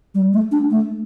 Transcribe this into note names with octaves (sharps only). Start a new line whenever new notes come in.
G3
A3
D4
A3